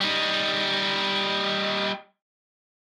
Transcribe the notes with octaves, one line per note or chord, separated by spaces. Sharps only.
G3 D#4